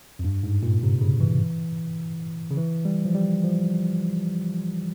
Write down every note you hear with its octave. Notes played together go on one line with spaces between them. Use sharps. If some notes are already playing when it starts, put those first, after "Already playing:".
F2
G2
G#2
A#2
C3
C#3
E3
C#3
E3
G3
F3
G3
F3